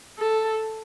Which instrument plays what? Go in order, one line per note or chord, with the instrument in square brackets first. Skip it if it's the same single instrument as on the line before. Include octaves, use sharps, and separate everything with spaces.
[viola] A4